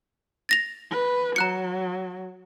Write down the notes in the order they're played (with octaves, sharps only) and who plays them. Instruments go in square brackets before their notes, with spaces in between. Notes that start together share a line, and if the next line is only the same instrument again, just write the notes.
[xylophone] A6 A#6 F7
[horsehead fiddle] B4
[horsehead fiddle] F#3 [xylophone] A#5 F#6 C#7